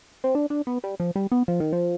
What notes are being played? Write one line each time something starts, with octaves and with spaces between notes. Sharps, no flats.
C4
D4
D4
B3
G3
F3
G3
B3
F3
D#3
F3